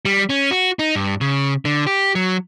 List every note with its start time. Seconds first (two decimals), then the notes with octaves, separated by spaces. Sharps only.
0.05 G3
0.30 C#4
0.51 F#4
0.79 D#4
0.96 G2
1.21 C#3
1.65 D3
1.87 G4
2.15 F#3